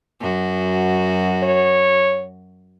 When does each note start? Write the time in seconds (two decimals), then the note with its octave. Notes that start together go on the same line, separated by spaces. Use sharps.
0.21 F#2 F#4
1.43 C#5